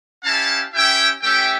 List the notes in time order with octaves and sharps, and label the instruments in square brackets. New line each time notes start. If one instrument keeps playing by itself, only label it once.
[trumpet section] C#4 E4 G4 F5 A5
C#4 E4 G4 E5 G5
A3 C#4 G4 E5 G5